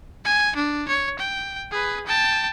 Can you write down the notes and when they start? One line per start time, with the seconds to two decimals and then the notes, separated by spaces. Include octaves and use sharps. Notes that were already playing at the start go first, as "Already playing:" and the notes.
0.25 G#5
0.56 D4
0.88 C#5
1.19 G5
1.71 G#4 B4
2.06 G5 A5